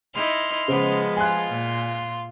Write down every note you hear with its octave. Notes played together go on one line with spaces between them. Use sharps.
D#4 E4 C6 F6
C#3 F3 G#3 B3 C5
F4 G#5 C6 F#6
A#2